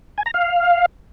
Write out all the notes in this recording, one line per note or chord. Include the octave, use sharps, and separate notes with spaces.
G#5
A#5
F5